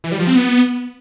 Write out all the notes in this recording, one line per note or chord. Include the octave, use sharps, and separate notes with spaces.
E3
G3
F3
C4
B3